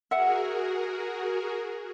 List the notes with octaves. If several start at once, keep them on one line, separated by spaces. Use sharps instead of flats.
F#4 G#4 A#4 E5 F#5